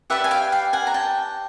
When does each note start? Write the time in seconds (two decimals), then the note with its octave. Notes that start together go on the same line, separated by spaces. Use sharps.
0.10 G4 B4 D5 E5 F#5
0.24 G#5
0.31 F5 G5
0.52 F5 G5
0.73 F#5 G#5
0.87 A#5
0.94 G5 A5